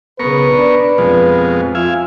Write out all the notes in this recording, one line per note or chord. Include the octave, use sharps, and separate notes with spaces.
B1 C#3 B3 A#4 B4 C#6
D4
F2 B2 F3 G#3
F4 E5 F5 G#5